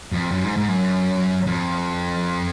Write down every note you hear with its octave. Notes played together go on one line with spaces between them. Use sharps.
F2
F#2
G#2
G#2
F#2
F2